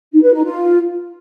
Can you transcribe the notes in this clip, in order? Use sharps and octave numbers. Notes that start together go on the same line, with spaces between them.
D#4
B4
D#4
F4